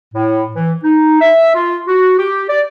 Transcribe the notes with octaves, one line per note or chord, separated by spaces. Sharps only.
A2
E3
D#4
E5
F4
F#4
G4
D5